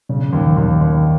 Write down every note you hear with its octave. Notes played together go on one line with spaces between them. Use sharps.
C#3
D#2
D#2
D#2